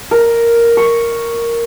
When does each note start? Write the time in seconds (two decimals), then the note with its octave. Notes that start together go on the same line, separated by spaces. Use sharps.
0.11 A#4
0.77 C#6